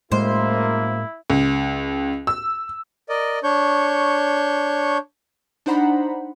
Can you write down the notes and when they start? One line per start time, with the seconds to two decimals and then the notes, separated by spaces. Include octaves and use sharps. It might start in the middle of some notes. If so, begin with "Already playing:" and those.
0.12 F#2 A2 G#3 A#3 E4 C5
1.30 C#2
2.27 E6
3.09 A#4 D5 D#5
3.43 D4 C#5 C#6 G6
5.66 D4 D#4 C5 F#5 A#5 B5